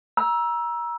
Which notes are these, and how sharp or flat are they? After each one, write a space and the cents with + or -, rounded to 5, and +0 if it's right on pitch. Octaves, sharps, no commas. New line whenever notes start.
A#5 +30 E6 +0